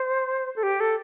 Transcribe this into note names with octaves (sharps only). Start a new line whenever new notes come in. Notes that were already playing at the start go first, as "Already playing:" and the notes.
Already playing: C5
A4
G4
A4